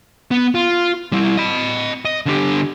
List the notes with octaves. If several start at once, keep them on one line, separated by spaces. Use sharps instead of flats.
B3
F4
G3 E4
D#5 B5
D#5
D3 G4